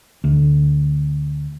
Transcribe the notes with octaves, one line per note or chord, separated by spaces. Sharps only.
D2